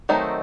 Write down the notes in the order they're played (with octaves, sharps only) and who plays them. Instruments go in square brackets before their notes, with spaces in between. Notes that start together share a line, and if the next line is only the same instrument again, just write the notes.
[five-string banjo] D#3 F#3 A3 C4 D#4